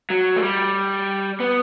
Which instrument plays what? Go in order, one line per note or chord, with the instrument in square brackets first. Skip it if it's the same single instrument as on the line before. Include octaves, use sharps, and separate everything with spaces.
[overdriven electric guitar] F#3
A3
G3
B3